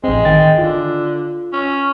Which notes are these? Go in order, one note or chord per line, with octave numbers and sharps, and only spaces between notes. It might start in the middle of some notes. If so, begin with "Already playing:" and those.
A1 G#3 C4
D#3 G5 A6
D3 F4
C#4